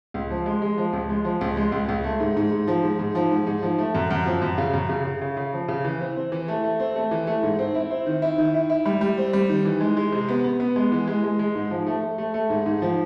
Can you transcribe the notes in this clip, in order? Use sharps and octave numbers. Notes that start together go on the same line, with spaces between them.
C#2
F3
G#3
G#3
F3
C#2
G#3
F3
C#2
G#3
C#2
C#2
A3
G#2
G#2
G#2
F3
G#2
G#2
F3
G#2
G#2
F3
A3
F#2
F#2
F3
F#2
C#3
F#2
C#3
C#3
C#3
C#3
F3
C#3
E3
C4
C4
E3
A3
A3
C4
A3
E3
A3
G#2
C4
E4
C4
D#3
E4
D#3
E4
E4
G3
G3
C4
G3
D#3
E3
G#3
G#3
C3
B3
B3
B3
G#3
E3
G#3
G#3
G#3
G#2
F3
A3
A3
A3
A3
G#2
G#2
F3